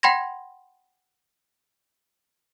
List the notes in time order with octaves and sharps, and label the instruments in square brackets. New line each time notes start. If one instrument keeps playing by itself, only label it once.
[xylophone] F#5 G5 B5 C6 G#6 A#6